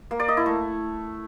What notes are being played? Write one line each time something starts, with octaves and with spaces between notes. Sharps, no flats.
A#3
D5
D#5
E4
A3